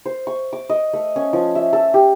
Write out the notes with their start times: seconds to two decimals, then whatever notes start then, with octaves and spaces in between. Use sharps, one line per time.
0.06 C5
0.27 C#6
0.53 D6
0.70 D#5
0.93 A3
1.16 C#4
1.33 F3
1.55 E5
1.73 A4
1.94 G4